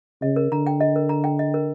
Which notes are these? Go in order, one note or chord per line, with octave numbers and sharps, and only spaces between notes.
C#3 D#5
A#4
D3 A#5
G5
D#5
A#4
A#5
G5
D#5
A#4